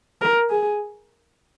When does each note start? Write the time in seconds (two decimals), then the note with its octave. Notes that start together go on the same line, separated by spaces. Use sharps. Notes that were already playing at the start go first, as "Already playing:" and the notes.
0.21 A#4
0.50 G#4